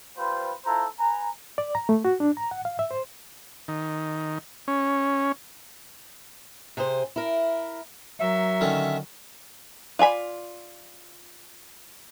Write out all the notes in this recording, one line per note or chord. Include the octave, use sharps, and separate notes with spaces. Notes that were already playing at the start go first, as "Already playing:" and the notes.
G3 F4 B4 C5
E4 F4 A4 C5 A#5
B4 G#5 A#5
D5
A#5
A3
F#4
D4
A#5
F#5
F5
E5
C5
D#3
C#4
C3 G#4 C5
E4 A#4
F#3 A#4 E5
D3 D#3 C#4
F4 D5 G#5 B5